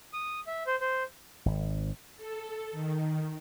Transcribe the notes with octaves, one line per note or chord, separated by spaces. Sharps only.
D#6
E5
C5
C5
G#1
A4
D#3